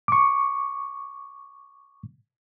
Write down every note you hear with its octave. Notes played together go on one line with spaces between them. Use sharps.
C#6 D6